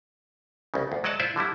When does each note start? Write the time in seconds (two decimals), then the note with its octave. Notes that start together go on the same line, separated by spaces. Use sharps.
0.74 C2 C#3
0.92 D2
1.04 F#3 G#3 D5 D#5 F#5 A5
1.20 E4 F4 C5 D5 E5
1.36 D3 F#3 G3 E4